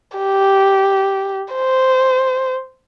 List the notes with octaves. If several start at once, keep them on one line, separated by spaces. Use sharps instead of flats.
G4
C5